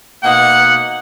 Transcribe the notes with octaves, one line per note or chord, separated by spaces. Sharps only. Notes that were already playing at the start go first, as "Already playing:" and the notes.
B2 A#3 D#4 F#5